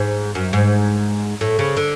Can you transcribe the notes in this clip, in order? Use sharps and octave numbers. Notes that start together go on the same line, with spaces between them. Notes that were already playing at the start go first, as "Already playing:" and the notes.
Already playing: G#2
F#2
G#2
A2
C#3
D3